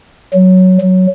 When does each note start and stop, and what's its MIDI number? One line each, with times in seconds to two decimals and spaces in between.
0.34 0.78 54
0.81 1.07 54